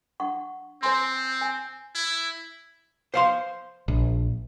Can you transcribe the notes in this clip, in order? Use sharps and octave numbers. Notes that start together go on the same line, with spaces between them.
D4 F#5 C#6
C4 C5 G#5 C6
G#5
E4
C5 F5 C6
A#1